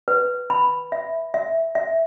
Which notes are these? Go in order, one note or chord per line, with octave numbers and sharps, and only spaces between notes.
B4
B5
E5
E5
E5